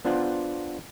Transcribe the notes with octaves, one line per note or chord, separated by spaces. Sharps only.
B3 D4 F4 C5 F#5